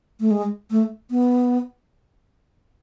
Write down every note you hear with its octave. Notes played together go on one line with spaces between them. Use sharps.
A3
G#3
A3
B3